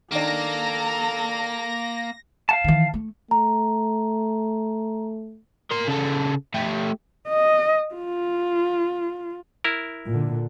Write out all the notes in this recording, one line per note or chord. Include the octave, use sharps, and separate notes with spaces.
D#3 A#3 D4 A4 A#5 A#6
F5 F#5 A5
D#3 E3
A3
A3 A#5
A#4 C6
C#3 A4
A3 G4
D#5
F4
E4 A#4
A#2 D3